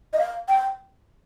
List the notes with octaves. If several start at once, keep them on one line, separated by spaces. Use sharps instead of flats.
D#5
F5
G5